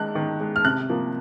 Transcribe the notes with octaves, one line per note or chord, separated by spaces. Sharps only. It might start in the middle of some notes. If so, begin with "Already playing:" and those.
Already playing: D#3 G#3 F#6
D#3
G#3
F6
C3 F#6
F3 A#3